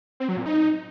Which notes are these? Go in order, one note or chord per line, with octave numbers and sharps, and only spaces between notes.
C4
F#3
A#2
D#4